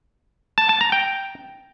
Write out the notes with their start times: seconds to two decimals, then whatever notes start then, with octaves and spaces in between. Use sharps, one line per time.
0.58 A5
0.69 A5
0.81 A#5
0.92 G5